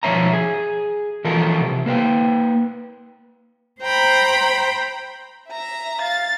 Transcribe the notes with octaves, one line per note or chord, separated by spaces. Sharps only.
B1 F3 G#3 C#5 E5 A#5
G#4
E3 F3 F4 A4 A#4
C3
A#3 B4 E5 G5
C5 G5 A#5 B5
E5 A#5
F5 A6